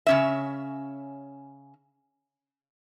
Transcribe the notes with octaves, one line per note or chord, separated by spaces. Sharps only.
C#3 C#4 E5